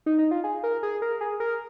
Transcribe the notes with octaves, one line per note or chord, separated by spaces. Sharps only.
D#4
D#4
F4
G#4
A#4
G#4
A#4
G#4
A#4